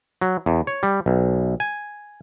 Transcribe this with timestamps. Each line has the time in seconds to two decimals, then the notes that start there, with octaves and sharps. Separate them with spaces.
0.21 F#3
0.46 E2
0.67 C#5
0.83 G3
1.06 B1
1.60 G#5